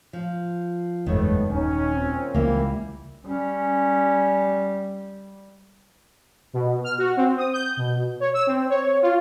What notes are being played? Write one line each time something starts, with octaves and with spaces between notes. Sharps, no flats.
F3
F#1 E2 G#2 D#3 A3 B3 C#5
D#1 C#4 D#4
A#2 C4
C#2 E3 G3 A#3 E4
G3 C#4
B2
F6
F#4
C4
D#6
G6
B2
C#5
E6
C4
C#5
F4